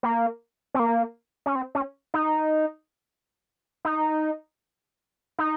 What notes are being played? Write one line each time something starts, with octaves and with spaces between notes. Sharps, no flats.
A#3
C4
A#3
C#4
C4
C#4
D#4
D#4
D#4